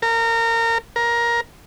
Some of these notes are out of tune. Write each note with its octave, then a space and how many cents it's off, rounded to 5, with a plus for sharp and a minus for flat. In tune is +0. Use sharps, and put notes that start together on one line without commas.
A#4 -25
A#4 +15